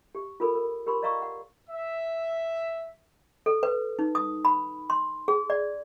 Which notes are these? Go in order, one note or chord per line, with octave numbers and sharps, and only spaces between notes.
G4
F4 A4 A#4 B5
A#4
G4 A#4 B5 C6
D5 D#5 F5 A#5 C#6 E6
F#5
E5
A4
B4
D#4
D#6
B5
C6
G#4
D5